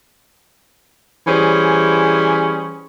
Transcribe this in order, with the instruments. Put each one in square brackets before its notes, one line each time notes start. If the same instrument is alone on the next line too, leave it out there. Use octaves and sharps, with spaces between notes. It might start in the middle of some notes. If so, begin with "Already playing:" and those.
[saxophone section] E3 G3 C#4 G#4 C5